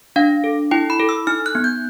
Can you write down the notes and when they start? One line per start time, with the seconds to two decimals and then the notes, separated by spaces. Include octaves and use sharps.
0.16 D4 F5
0.44 A4
0.71 E4 G5
0.90 B5
1.00 A4
1.09 E6
1.27 D#4 F6
1.46 F#6
1.55 B3
1.64 G6